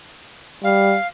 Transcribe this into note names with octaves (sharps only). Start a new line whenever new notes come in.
G3 F5